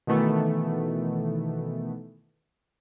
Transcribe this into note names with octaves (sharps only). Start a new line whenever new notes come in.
B2 D#3 E3 A3 B3